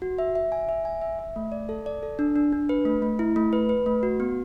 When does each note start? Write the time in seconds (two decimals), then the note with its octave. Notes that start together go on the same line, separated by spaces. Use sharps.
0.02 F#4
0.19 E5
0.35 E5
0.52 G#5
0.69 E5
0.85 G#5
1.02 E5
1.19 E5
1.36 A3
1.52 D5
1.69 A4
1.86 D5
2.03 A4
2.19 D4
2.36 D4
2.52 D4
2.69 B4
2.85 A3
3.02 A3
3.19 E4
3.36 A3
3.53 B4
3.69 B4
3.86 A3
4.03 F#4
4.20 B3